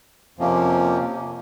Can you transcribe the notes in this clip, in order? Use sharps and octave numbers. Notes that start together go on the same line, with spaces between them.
F2 C3 F3 A#3 C#4